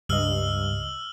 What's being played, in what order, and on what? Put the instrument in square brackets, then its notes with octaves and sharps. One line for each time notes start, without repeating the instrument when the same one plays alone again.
[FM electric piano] C#2 D#5 [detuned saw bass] G2 [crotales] E6 F6 F#7